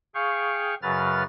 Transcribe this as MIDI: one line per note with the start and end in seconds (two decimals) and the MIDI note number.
0.15 0.75 68
0.15 0.75 77
0.15 0.75 79
0.15 0.75 85
0.82 1.23 42
0.82 1.23 49
0.82 1.23 54
0.82 1.23 71
0.82 1.23 89
0.82 1.23 93